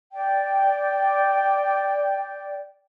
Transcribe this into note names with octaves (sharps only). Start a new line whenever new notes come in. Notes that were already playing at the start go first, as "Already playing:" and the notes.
D5 G5